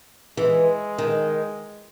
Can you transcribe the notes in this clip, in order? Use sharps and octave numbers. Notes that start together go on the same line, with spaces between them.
E3 G#3
D#3